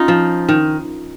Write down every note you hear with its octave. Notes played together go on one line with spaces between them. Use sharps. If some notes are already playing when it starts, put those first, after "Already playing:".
Already playing: C#4 D#4 F4
F3
D#3